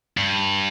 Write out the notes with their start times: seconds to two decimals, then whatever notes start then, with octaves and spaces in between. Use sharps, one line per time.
0.18 G2